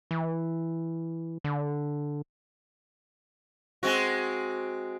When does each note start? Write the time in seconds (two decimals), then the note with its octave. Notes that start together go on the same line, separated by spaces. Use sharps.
0.11 E3
1.44 D3
3.83 G#3 C4 F#4